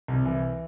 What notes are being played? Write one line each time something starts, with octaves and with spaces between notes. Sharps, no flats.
C2
E3